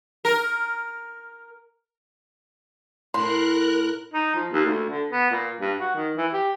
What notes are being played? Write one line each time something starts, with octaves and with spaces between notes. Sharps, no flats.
A#4
A2 A#4 C6 F#6
D#4
F3
D#2
D2
D3
B3
A#2
G2
F#4
D#3
E3
G4